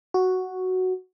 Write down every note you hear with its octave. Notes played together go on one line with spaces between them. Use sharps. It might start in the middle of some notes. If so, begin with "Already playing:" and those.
F#4